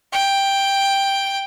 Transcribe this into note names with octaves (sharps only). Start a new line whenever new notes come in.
G5